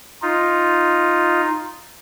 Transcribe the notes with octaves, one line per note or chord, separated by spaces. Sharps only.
D#4 F4